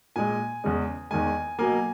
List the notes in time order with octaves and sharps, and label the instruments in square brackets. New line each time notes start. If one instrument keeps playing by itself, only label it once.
[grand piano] A#2 G#3 G#5
E2 C#3 G#3
E2 D#3 G#3 G#5
B2 F#3 A#3 G#5